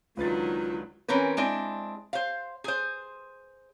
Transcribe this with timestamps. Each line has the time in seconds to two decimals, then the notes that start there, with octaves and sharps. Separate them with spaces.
0.17 C#2 D3 D#3 F#3 F4 B4 A6
1.08 E3 C4 C#4 A#4 B4
1.37 G#3 C4 D4 E4
2.13 C5 F5
2.64 G#4 C5